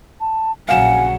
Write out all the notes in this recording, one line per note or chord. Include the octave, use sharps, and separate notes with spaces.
A5
A#1 C#3 F#3 F5 F#5 G#5 E7